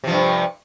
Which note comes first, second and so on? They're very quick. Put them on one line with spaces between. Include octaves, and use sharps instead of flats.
C3 F3 G2